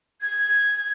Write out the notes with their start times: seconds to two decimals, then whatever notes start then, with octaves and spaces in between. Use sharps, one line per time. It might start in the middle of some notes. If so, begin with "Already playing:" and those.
0.21 G#6